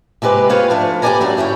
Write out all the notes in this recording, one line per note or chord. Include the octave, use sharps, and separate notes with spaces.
C3 G#3 G4 B4
C4 F4 B4 C#5
F3 A3 D4
G4 B4 C#5 D5 G#5 A#5
F#3 G3 A3 D4
C#3 E4 C#5 G5